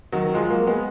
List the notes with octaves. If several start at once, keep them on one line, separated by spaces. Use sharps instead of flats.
D#3 F#3
F3 G#3
F#3 A#3
G#3 B3